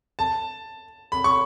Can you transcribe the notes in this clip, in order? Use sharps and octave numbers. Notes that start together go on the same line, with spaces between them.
A5
B5
C#6